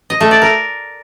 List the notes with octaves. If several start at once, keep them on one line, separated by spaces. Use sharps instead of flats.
D#5
A3
D5
A#4